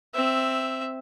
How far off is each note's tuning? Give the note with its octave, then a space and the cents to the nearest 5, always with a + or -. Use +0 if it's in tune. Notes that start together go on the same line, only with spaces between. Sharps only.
C4 +0 E5 +0